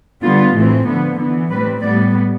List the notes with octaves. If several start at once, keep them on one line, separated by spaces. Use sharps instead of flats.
D3 G3 B3 F4
A2 E3 A3 C4
D3 F3 B3
E3 B3
A2 G3 C4 B4
A2 G3 B3 D5